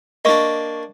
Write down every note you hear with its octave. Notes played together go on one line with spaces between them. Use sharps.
A#3 D4 D#5 C#6